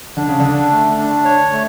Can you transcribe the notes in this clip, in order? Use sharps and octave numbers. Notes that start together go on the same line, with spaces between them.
D3 D4
C#3
D3 D4
A3
D4
C#5
A3